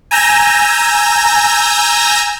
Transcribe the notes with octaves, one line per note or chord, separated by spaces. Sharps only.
G#5 A#5 E6 G6 A#6